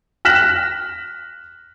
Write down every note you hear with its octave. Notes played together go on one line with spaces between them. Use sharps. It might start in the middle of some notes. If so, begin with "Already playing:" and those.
F6 F#6 A#6 B6 E7 F#7